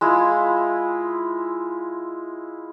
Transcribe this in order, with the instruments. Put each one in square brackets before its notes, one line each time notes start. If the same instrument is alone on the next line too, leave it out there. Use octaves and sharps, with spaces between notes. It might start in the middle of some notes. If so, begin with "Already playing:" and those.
[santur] G#3 E4 F4